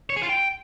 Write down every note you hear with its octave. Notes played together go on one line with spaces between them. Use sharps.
C#5
G#4
F4
G5